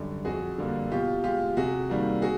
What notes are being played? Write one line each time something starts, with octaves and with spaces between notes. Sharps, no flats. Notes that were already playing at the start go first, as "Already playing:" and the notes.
Already playing: F#2 D3 G3
F2 F#4 G#4
D3 G3 A#3
B2 F4 G4
G#3 F4 G4
C3 F#4 G#4
D#3 G3 A#3
F#4 G#4